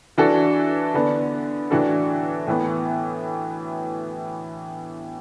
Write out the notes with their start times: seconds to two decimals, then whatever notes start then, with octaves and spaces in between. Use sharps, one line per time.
0.18 E3 D4 F#4 A4
0.94 D3 B3 D4
1.71 A2 E3 D4 F#4 A4
2.47 A2 E3 B3